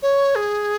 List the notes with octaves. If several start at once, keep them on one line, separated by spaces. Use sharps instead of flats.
C#5
G#4